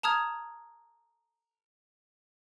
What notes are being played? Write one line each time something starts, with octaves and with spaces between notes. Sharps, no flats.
A5 A#5 D#6 F6 G#6